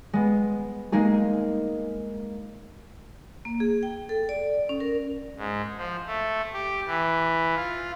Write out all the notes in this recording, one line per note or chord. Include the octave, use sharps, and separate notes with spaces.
G#3 B3
G#3 A#3 D#4 G#4
A#3
G#4
G5
A4
D5
C#4
A#4
G#2
F3
A3
G4
E3
F4